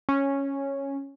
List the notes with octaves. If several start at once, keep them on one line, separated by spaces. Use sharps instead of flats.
C#4